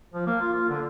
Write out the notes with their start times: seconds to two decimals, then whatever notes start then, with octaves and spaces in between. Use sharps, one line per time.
0.14 F3
0.27 A#3
0.41 F4
0.53 F4
0.69 D3